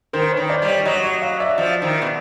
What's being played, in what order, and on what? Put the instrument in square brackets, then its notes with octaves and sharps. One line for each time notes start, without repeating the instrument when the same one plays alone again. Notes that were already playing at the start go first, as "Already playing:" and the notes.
[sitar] D#3 [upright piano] A#4 C5
[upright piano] B4 C#5
[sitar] D#3
[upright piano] C5 D5
[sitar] G3
[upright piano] C#5 D#5
[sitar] F#3 [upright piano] C#5 D#5
[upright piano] C#5 D#5
D#5 F5
D5 E5
[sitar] F3
D#3
B2